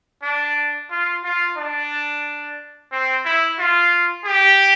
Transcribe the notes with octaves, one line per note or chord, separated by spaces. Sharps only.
D4
F4
F4
D4
C4
E4
F4
G4